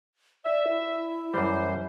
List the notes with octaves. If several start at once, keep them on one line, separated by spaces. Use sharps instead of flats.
D5 E5
E4
F#2 E3 G3 C5